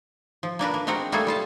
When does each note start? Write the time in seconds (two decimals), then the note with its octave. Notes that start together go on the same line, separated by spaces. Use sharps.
0.43 F3
0.59 A#3 D4 A#4 B4
0.74 A#3
0.87 G#3 C4 F#4 A#4 F#5
1.12 G3 A3 A#3 G#4 A4
1.27 G3 F4 A5